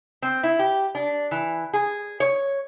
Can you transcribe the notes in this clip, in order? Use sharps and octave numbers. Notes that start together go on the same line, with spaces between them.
C4
E4
G4
D4
E3
G#4
C#5